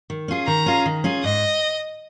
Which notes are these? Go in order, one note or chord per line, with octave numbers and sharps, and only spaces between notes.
D#3
C#4 F4 G#4
D#3 A#5
C#4 F4 G#4
D#3
C#4 F4 G#4
G#2 D#5